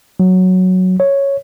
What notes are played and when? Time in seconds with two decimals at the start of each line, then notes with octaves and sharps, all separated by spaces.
0.20 F#3
1.00 C#5